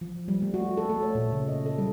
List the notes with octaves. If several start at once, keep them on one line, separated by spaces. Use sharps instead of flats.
F3
G3
A3
F#4
A4
A3
C#5
A#2
C#3
D#5
A4
G3